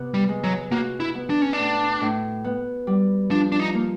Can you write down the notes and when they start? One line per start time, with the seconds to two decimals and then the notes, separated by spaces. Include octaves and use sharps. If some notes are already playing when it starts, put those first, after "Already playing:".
Already playing: C3 B3
0.14 G3
0.29 G#3
0.44 F#3
0.71 A#3 F#4
1.00 E4
1.15 B3
1.30 D4
1.42 C#4
1.53 A2 D4
2.01 A2
2.44 B3
2.87 G3
3.31 F3 D4
3.52 D4
3.60 D#4
3.74 A#3